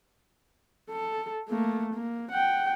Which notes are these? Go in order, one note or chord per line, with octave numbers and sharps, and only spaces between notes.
A4
A3 A#3
A#3
F#5 G5